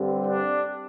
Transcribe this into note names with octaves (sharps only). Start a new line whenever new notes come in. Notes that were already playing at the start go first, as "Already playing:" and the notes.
Already playing: G2 D3 G3 C4
D4